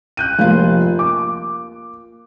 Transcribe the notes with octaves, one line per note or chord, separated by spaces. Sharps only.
F#6 G6 D#7
F1 A#3 F4
D6